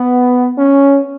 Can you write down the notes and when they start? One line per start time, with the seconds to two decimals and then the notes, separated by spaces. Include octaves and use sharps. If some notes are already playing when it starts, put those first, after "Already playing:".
Already playing: B3
0.58 C#4